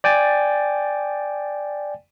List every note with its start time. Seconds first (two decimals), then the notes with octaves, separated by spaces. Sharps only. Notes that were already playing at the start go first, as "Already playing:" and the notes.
0.04 D5 G5 G#5 A6